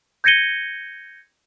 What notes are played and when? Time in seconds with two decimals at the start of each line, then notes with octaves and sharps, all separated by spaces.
0.24 G6 G#6 A#6 C#7 D#7 G7